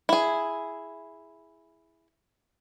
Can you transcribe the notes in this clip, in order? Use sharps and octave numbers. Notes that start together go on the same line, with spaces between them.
E4 G#4